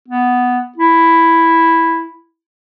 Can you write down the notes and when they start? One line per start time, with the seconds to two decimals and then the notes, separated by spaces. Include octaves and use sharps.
0.08 B3
0.78 E4